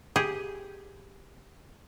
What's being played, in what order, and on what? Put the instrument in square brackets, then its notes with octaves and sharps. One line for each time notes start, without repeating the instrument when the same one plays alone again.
[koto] G4 G#4